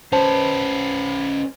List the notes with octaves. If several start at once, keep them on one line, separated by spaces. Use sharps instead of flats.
C#4 B4 C5 A5